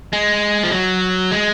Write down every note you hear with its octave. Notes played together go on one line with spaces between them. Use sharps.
G#3
F3
F#3
G#3